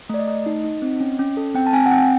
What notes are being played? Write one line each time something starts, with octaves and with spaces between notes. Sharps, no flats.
A3 D5
D#5
A3
D#4
D#4
C4
C#4
C#4
A4
C4 G5
A5
C4 G#5
F#5
C4 G5